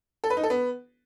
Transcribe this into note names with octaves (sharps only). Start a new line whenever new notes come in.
A4
B4
D#4
A4
B3